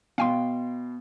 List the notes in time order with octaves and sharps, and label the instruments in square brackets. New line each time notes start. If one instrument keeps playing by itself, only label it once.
[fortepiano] B2 [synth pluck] F5 G5 C6